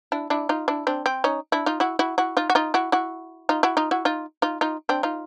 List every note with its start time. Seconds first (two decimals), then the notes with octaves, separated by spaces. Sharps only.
0.12 D4 E4
0.30 D4 E4
0.49 D#4 F4
0.68 D4 E4
0.87 C4 D4
1.06 C4
1.24 C#4 D#4
1.52 D4 E4
1.66 D#4 F4
1.80 E4 F#4
1.99 E4 F#4
2.18 E4 F#4
2.37 D#4 F4
2.50 F#4
2.55 D#4 F4
2.74 E4 F#4
2.92 E4 F#4
3.49 D#4 F4
3.63 E4 F#4
3.77 D#4 F4
3.91 E4 F#4
4.05 D#4 F4
4.42 D#4 F4
4.61 D#4 F4
4.89 C4 D4
5.03 D#4 F4